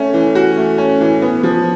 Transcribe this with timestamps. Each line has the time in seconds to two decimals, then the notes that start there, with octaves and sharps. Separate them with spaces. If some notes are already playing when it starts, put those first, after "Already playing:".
Already playing: A3 C#4
0.14 E3
0.35 F#4
0.57 A3
0.78 C#4
1.01 E3
1.22 B3
1.43 F3